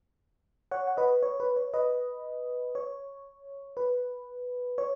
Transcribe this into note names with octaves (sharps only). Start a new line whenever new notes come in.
C#5 F#5
F#5
B4 D#5
C#5
B4
C#5
B4 D#5
C#5
B4
C#5